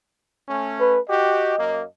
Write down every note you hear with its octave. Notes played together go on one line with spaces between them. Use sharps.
A3 C#4
B4
F#4 G4 D#5
F#2 A#3